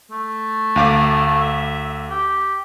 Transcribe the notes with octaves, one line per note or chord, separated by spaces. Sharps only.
A3
D2 F5 D6
E5
G4